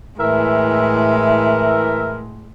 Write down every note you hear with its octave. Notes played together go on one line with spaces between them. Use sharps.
A2 E3 G#3 A#4 E5